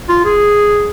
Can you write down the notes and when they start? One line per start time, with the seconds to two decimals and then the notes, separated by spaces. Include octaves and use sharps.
0.09 F4
0.25 G#4